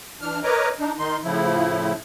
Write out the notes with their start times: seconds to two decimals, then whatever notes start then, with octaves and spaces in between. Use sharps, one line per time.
0.21 E3 D4 F6
0.43 A#4 B4 C#5 D#5 A#5 D6
0.79 D4 D#4
0.99 D#3 D#4 C6
1.24 A2 C#3 F3 E4